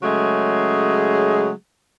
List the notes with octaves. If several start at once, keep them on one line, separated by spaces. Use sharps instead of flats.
C#3 F#3 G#3 A3 G#4